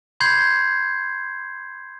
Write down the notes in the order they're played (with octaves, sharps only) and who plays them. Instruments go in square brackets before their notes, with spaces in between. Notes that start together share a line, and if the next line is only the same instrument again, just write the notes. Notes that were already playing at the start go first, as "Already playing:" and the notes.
[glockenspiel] B5 C6 G6 G#6 C7